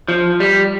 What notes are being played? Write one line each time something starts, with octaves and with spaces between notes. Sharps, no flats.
F3
G3